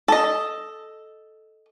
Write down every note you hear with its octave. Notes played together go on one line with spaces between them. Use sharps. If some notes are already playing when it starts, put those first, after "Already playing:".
A4 D#5